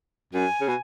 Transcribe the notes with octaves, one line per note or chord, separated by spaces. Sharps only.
F#2 G#5
C#3
B2